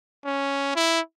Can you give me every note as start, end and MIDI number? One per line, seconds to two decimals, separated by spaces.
0.25 0.71 61
0.76 1.00 64